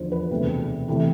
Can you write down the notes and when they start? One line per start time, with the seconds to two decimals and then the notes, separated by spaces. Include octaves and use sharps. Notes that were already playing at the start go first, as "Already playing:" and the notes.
Already playing: E2 D3 F3 C5
0.12 B4
0.31 E1 D2 C3
0.88 C3 E3 A3